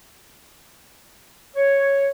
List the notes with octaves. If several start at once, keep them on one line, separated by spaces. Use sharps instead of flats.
C#5